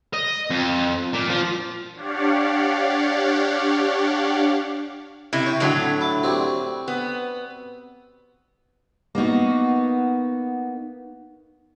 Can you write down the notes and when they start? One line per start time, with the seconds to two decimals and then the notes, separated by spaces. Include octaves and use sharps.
0.14 D#5
0.50 F2
1.13 A#2
1.29 F3
1.95 D4 G4 C#5 D5 F5 F#5
5.33 C3 E4
5.46 C#5 G5
5.60 A2 D3 F#3
6.01 E4 A5
6.23 G3 C4 F#4
6.88 B3
9.15 A#3 B3 D#4 F#4